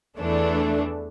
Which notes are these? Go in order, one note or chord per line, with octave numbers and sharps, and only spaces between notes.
E2 E3 A3 D4